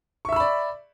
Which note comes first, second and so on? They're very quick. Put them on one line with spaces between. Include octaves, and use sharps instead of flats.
C#6 E5 E6 B5 D5